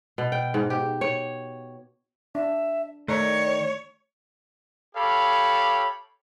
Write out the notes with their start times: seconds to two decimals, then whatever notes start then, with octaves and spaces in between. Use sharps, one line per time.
0.18 B2
0.32 G5
0.54 G#2
0.70 G4
1.01 C#5
2.35 D4 E5
3.08 D#3 A3 C#5 D5
4.96 G4 A4 C#5 F5 B5